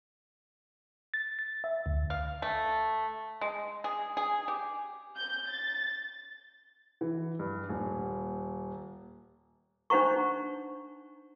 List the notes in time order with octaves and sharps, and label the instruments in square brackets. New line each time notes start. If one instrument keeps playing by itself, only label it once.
[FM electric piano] A6
A6
E5
D2
[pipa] F5
A3
G#3
G#4
G#4
G4
[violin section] G6
A6
[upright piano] E3
G2
D#1
[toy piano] D4 D#4 C5 F#5 A#5 C#6